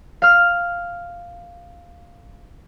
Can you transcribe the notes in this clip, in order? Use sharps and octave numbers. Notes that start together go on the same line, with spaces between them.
F5 F6